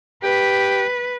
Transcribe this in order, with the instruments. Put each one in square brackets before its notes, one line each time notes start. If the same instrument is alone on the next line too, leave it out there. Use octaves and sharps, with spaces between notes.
[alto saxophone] G4 [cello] B4